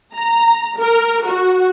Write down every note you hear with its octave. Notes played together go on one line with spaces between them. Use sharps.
A#5
A#4
F#4